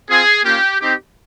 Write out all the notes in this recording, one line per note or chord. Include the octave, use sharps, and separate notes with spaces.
C4 F4 G#4
A#3 C#4 F4 G4
C4 D#4 G4